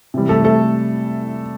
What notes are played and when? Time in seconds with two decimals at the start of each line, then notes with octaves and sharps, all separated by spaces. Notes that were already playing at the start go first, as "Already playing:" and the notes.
0.14 C3 E3 G3
0.29 A3 A4
0.44 A3 A4